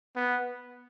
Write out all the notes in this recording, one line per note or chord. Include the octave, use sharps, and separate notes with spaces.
B3